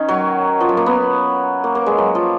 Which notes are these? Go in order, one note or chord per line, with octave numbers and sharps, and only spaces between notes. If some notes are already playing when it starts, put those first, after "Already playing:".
Already playing: D#3 C#4
F#3
F3
F#3
A#3
B3
A#3
A#3
G#3
F#3
F3